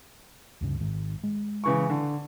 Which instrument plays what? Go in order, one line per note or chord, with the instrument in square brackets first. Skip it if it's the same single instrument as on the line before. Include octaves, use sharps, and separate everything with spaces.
[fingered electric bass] D2 G2 C#3
G#1 G#2 D#3
G#3
[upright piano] C#3 E3 C#6
D3